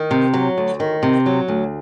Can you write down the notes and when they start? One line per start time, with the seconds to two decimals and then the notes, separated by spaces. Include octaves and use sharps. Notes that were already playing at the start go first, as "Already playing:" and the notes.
Already playing: D#3
0.11 C3
0.34 F#3
0.58 D2
0.80 D#3
1.03 C3
1.26 F#3
1.48 D2